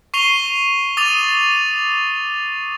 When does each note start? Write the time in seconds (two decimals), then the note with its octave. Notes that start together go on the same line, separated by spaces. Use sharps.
0.14 C#6 C7 D#7 F7 G7
0.97 D6 D#6 A6 D#7 F7